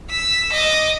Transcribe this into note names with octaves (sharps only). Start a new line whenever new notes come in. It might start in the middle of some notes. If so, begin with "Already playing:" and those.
E6 B6
D#5 D6